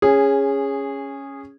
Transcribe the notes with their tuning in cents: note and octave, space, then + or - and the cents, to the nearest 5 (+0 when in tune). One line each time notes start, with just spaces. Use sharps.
C#4 +0 G#4 -15